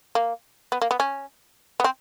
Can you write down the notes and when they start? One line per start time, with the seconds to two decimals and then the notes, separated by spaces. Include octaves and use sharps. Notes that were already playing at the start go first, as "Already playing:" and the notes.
0.15 A#3
0.72 B3
0.82 A#3
0.91 B3
1.00 C#4
1.80 B3
1.84 C4